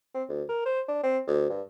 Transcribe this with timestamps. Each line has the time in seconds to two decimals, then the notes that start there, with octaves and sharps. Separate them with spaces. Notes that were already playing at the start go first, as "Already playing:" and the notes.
0.14 C4
0.29 D2
0.49 A#4
0.66 C5
0.88 D4
1.03 C4
1.27 D2
1.49 G2